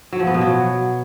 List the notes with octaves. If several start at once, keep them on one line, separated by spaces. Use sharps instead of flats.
F#3
F3
B3
B2
F#3